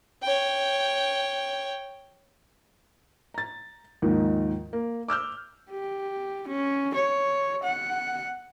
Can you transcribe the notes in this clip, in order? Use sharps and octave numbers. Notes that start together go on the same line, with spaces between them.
C#5 G5
A#5 A6
D#2 G#2 D#3 F3
A#3
D6 E6 F6 G6
G4
C#4
C#5
F#5